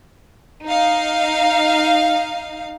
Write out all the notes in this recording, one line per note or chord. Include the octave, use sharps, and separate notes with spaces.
D#4 F5